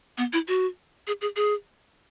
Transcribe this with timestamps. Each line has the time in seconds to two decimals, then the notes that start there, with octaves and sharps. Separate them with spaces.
0.18 B3
0.33 E4
0.48 F#4
1.07 G#4
1.21 G#4
1.36 G#4